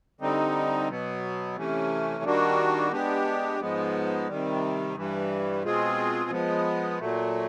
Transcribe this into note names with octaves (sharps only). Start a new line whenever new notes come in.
D3 G3 C4 D#4
B2 F#3 B3
C3 E3 A3 C#4
D#3 G3 A#3 D4 F#4
G#3 B3 D4 G4
G#2 F3 G#3 B3
C3 D#3 G3
G2 E3 G3
B2 G#3 C4 F4 G#4
F3 G#3 B3
A#2 F#3 A3